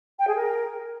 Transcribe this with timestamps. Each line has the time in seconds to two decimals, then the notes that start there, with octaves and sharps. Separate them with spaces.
0.19 G5
0.27 G#4
0.35 A#4